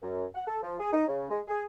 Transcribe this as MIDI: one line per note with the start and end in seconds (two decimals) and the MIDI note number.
0.03 0.25 42
0.35 0.47 78
0.48 0.58 69
0.63 0.76 53
0.80 0.92 68
0.93 1.05 63
1.08 1.30 49
1.30 1.41 56
1.48 1.63 68